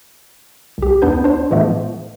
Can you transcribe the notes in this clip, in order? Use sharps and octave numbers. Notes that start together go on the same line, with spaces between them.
C2 G4
D#2 B3 D4 B4 G6
D4 C5
A2 E3 F3 G#3 A3 B3